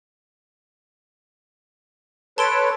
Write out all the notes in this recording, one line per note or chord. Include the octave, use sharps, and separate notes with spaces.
A4 B4 C#5 A5 C6 D7